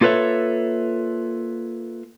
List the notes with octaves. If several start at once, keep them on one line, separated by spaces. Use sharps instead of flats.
A#3 F4 A4 B4 C#5 E5